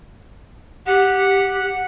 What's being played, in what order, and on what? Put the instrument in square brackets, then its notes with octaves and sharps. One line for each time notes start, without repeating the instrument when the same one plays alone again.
[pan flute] G4 [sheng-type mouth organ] F#5